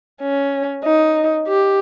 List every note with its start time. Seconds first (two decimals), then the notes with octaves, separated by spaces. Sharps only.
0.21 C#4
0.84 D#4
1.48 G4